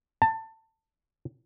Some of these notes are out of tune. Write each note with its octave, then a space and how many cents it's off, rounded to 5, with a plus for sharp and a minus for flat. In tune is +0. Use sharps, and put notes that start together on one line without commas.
A5 +20